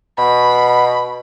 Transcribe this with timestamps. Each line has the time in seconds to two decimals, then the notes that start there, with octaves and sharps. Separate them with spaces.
0.18 B2 B5